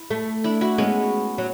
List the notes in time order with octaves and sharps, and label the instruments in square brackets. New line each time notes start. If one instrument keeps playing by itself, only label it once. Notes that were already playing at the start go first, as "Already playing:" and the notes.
Already playing: [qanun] E4
[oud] A3
[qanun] D4 E4
E4 F#4
[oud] G#3 [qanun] B3 C#4
[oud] F#3